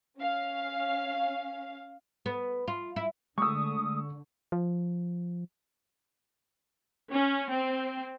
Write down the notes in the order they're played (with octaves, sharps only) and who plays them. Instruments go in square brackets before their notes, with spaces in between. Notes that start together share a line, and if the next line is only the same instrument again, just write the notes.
[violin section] C#4 F5
[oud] B3
F4
E4
[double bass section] D3 [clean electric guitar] G#3 A3 [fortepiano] C#6 E6 [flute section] D#6
[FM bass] F3
[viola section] C#4
C4